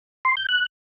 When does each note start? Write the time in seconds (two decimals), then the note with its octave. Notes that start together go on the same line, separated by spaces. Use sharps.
0.25 C6
0.37 G6
0.49 F#6